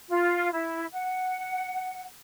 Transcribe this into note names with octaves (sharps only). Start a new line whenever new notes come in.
F4
E4
F#5